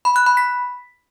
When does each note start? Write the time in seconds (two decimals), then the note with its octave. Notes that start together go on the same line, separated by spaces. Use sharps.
0.05 B5
0.16 F#6
0.26 B5
0.37 B6